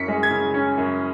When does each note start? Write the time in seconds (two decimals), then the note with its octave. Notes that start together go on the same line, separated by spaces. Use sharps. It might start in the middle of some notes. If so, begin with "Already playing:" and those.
Already playing: F#2 C#4 B6 C#7
0.08 G#3
0.23 G#6
0.31 C#3
0.54 C#4
0.78 F#2